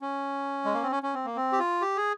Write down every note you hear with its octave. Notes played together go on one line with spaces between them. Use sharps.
C#4
G#3
A#3
C4
C#4
C#4
C4
A#3
C4
G4
F4
G4
G#4